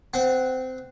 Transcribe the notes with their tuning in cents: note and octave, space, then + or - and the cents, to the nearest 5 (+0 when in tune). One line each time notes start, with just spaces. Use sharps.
C4 -20 F#5 +0